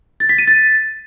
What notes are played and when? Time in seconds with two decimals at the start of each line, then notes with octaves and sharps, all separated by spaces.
0.20 A6
0.29 B6
0.38 D#7
0.48 A6